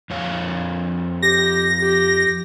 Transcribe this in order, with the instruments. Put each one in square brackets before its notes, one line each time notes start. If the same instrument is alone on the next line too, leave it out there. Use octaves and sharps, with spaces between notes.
[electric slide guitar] F2 C#5 F5
[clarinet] G4 [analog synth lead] A#6
[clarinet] G4